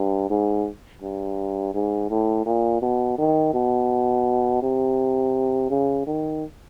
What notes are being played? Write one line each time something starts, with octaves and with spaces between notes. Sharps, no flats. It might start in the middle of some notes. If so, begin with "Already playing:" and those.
Already playing: G2
G#2
G2
G#2
A2
A#2
B2
D#3
B2
C3
C#3
D#3